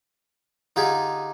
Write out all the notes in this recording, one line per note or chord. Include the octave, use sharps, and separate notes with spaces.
D3 D#4 F4 G4 G#4